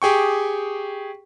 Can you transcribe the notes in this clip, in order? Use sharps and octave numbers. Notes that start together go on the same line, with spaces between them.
G4 G#4 G5 C#6